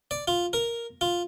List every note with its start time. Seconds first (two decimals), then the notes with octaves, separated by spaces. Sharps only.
0.11 D5
0.28 F4
0.53 A#4
1.01 F4